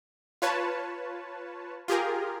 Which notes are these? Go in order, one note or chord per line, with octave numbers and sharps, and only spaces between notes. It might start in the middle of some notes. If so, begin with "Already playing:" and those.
F4 B4 C#5 A5
F4 G4 G#4 A#4